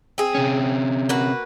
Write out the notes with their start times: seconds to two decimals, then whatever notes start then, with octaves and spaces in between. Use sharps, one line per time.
0.18 C4 G#4
0.35 C3 C#4
1.09 A#3 F#4 B4